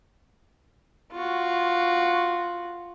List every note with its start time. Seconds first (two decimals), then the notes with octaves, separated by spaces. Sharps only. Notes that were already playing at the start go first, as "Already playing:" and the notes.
1.12 F4 F#4